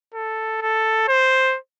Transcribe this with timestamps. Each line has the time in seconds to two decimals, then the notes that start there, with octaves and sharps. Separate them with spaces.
0.14 A4
0.62 A4
1.08 C5